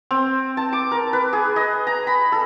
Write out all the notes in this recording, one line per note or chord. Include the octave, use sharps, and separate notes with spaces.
C4
A5
D6
A#4
B4
G#4
D#5
A#5
B5
A4